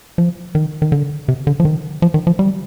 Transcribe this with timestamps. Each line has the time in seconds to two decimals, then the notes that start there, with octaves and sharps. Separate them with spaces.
0.18 F3
0.55 D#3
0.82 D#3
0.92 D3
1.28 C3
1.47 D3
1.60 F3
1.65 D#3
2.02 F3
2.14 D#3
2.27 F3
2.39 G3